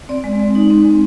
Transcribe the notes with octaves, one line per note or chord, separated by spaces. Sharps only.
C4 D5
G#3
G#3
D#4
C4
G#3